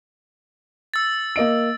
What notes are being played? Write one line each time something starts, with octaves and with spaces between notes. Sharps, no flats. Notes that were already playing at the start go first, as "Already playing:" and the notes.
E6 A6
A#3 D#5 D7